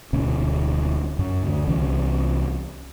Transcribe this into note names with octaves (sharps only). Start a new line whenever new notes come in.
D1 D2 B2 C#4
F#2
D2 D3
C2 E3 C#4